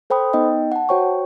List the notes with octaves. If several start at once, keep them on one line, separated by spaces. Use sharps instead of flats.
A4 C5 G5 B5 D#6
B3 D#4 D#5 G5
F#5 A5
F#4 C5 C#5 G5 C#6